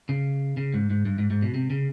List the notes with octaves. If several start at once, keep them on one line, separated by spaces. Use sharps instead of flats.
C#3
C#3
G#2
G#2
G2
G#2
G#2
B2
C3
C#3